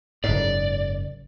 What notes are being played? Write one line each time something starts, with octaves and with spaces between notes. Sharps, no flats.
F#1 G#2 D5